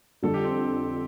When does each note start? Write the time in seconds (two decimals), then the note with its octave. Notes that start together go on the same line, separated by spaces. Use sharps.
0.22 F2 D3 G3 A4
0.34 G4
0.44 C4